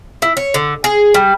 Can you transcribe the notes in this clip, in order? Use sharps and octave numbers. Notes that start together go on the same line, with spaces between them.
E4
C#5
D3
G#4
G3